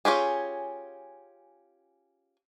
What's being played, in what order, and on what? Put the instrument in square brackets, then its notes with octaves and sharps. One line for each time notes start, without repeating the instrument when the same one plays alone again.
[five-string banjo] C#4 F4 G4 G#4